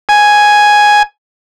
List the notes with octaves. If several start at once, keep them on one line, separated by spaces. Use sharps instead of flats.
G#5